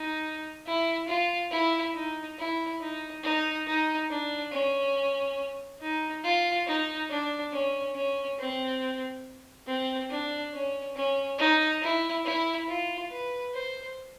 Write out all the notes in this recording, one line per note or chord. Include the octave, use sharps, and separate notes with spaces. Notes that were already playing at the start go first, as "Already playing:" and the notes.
Already playing: D#4
E4
F4
E4
D#4
E4
D#4
D#4
D#4
D4
C#4
D#4
F4
D#4
D4
C#4
C#4
C4
C4
D4
C#4
C#4
D#4
E4
E4
F4
B4
C5